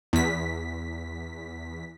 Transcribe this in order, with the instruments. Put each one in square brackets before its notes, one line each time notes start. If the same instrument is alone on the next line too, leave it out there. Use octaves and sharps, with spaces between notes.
[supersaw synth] E2 B6